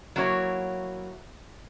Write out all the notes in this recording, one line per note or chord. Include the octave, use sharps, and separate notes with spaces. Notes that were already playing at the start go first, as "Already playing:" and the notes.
F#3 A#3 E4 F#4 C#5